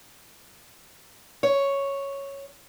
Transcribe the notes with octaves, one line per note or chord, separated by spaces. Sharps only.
C#5